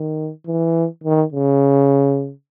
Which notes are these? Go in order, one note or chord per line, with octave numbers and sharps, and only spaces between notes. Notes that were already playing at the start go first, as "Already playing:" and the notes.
Already playing: D#3
E3
D#3
C#3